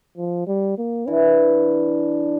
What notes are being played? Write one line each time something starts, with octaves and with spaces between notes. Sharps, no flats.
F3
G3
A#3
E3 D4